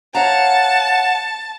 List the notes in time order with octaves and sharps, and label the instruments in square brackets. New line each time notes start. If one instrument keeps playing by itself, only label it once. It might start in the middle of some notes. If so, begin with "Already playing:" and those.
[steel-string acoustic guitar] C#5 F5 A#5 [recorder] F#5 [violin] A5